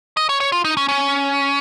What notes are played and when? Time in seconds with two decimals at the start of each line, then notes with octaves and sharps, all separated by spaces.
0.17 D#5
0.29 C#5
0.40 C#5
0.52 F4
0.65 D#4
0.77 C#4
0.89 C#4